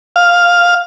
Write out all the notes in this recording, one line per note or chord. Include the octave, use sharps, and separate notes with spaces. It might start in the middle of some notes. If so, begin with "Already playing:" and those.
F5